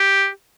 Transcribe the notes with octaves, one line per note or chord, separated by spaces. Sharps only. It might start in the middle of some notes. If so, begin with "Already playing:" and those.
Already playing: G4